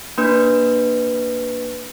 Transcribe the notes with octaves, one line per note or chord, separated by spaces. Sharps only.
A#3 D4 B4